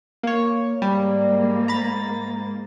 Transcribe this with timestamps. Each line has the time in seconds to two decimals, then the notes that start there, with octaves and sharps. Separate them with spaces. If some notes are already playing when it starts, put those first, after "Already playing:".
0.23 A#3 C#5
0.82 G#2 G3 A#3
1.68 A#5 B5 A6